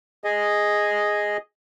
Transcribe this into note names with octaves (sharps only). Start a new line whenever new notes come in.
G#4 D#5